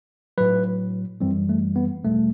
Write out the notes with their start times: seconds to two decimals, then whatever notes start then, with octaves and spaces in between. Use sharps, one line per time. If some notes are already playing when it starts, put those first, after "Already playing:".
0.38 A2 F#3 B4
1.21 F#2 E3 G3 C4
1.49 A3
1.76 B3
2.04 E2 B2 G3 A3